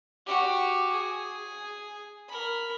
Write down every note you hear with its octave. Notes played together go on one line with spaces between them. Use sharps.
F#4 G4
G#4
A#4 B5